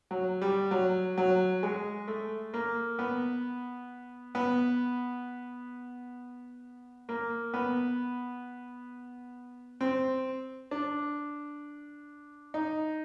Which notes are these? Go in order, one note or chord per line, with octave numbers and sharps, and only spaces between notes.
F#3
G3
F#3
F#3
G#3
A3
A#3
B3
B3
A#3
B3
C4
D4
D#4